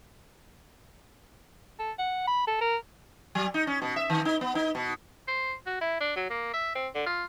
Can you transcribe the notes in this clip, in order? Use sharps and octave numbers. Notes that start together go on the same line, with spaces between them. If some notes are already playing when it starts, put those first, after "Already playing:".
A4
F#5
B5
A4
A#4
F#3
D#4
C#4
B2
E5
D#3
D#4
B3
D#4
B2
C5
F#4
E4
D4
F#3
A#3
E5
C4
D3
F4